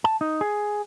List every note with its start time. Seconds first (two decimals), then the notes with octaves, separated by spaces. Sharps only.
0.04 A5
0.21 D#4
0.41 G#4